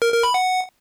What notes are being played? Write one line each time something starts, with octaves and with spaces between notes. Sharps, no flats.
A#4
A#4
B5
F#5